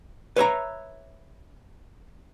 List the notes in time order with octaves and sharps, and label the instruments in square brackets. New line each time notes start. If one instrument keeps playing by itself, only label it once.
[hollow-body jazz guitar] B4 C#5 E5 A#5